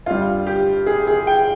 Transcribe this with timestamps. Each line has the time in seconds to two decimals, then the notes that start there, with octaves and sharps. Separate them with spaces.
0.06 G2 G3 F4
0.47 G4
0.86 G#4
1.07 G#4
1.27 G5